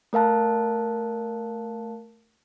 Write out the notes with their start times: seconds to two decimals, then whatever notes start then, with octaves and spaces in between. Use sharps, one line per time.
0.13 A3 A#4 F5 A5 F#6